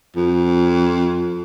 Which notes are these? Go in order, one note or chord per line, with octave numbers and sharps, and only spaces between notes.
F2